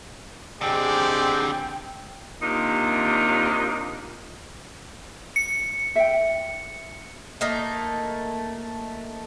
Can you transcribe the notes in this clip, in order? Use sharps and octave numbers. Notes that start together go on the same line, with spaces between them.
D3 G#3 C4 G4 D5 G5
D#2 C3 D4 D#4 F4 A#4
C#7
E5 G5
A3 A#3 D#4